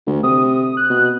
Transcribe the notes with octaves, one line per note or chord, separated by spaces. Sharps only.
D2
C3 D#6
F#6
B2